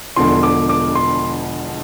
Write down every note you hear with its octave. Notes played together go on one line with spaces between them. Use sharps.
E1 E2 D3 F3 C6
D6
D6
C6